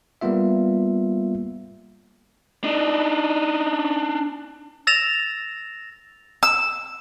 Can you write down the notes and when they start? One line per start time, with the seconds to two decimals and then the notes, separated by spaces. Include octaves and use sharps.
0.21 G3 A#3 B3 F4 E5
2.64 D4 D#4
4.87 E6 A6 A#6 E7 F7
6.43 E6